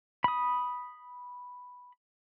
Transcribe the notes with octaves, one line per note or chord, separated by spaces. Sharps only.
B5 D#6